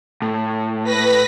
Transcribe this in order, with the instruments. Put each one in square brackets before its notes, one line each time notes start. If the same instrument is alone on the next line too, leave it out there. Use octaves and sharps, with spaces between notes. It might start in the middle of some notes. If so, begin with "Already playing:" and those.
[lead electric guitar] A2
[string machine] B4 A#6 B6